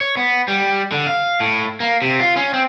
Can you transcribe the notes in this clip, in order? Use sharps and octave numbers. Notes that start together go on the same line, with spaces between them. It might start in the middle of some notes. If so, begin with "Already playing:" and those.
C#5
B3
G3
D3
F5
A2
A#3
C3
F4
C#4
C4